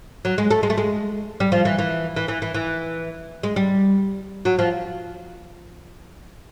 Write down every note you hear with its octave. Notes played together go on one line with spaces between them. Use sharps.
F#3
G#3
A3
G#3
A3
G#3
G3
F3
E3
E3
E3
E3
E3
E3
G#3
G3
F#3
F3